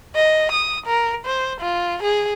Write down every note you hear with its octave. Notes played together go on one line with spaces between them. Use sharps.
D#5
D#6
A#4
C5
F4
G#4